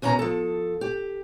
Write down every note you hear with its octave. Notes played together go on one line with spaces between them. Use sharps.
D#2 B2 C#4 A5 A#5
F3 A4
G4